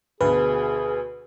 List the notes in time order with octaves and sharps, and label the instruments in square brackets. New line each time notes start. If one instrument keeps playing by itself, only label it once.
[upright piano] D2 B2 [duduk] G#4 [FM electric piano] B4